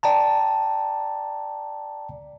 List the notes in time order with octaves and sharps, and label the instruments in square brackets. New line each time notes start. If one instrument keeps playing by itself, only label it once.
[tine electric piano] D5 G5 A5 A#5